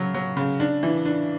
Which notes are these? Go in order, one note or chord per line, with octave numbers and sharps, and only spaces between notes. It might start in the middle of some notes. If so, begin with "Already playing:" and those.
Already playing: C#3 F#3
F#3
C#3
D4
E3
D4